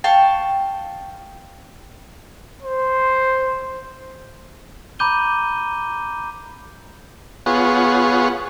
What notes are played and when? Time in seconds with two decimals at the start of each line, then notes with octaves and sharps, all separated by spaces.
0.04 F5 G5 A5 C#6
2.62 C5
4.99 A#5 B5 D6 G6 D#7 G7
7.46 B3 F4 G#4 C#5 F#5